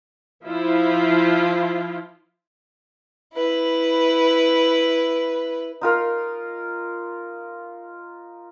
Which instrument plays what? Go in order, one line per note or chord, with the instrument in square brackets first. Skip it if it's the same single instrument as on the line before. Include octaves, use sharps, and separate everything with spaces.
[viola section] F3 E4 F4
[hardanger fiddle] E4 B4
[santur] D#4 F4 A#4